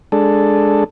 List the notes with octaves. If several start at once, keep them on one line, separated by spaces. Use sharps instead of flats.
G#3 D4 A4